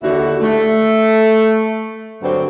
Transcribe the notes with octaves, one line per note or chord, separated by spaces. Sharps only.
D#2 D3 E4 F#4
A3
G2 D3 F#3 C4